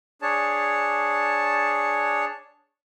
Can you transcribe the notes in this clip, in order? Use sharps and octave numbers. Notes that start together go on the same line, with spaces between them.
D4 G#4 C#5 A5